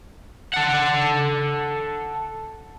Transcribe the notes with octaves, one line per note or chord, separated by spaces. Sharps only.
A4 F#5